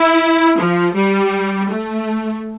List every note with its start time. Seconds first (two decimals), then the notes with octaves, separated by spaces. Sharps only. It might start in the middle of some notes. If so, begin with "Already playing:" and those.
Already playing: E4
0.59 F3
0.96 G3
1.70 A3